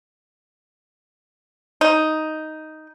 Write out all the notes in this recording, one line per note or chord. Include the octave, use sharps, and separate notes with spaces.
D#4